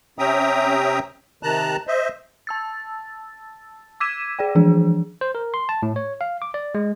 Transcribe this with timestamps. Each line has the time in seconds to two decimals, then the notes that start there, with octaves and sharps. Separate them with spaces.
0.19 C3 C#4 E5 G5 A#5 D#6
1.43 C3 D#3 A5 A#5 F#6
1.87 C5 D#5 E5
2.47 A5 E6 A6
4.00 D6 E6 G#6 B6 D#7 E7
4.39 G#4 D5 G5
4.55 E3 F3 D4 G#4
5.21 C5
5.35 A#4
5.54 C6
5.69 A5
5.83 A2
5.96 C#5
6.21 F5
6.42 D6
6.54 D5
6.75 G#3